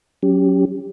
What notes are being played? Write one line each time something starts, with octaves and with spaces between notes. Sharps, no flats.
F#3 C#4 G4